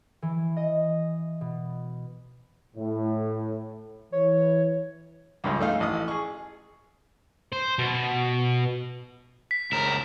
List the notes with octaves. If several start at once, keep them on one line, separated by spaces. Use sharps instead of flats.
E3
D#5
B2
A2
E3 C#5
C#2 G2 G#3
A3 D#4 F5
A1 D#5 D#6
G#4 C#6
C5
B2
B6
C#2 A#4 E7